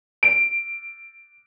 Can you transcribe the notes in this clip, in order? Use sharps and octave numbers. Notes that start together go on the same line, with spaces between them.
D7